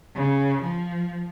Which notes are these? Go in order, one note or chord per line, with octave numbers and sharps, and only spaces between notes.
C#3
F3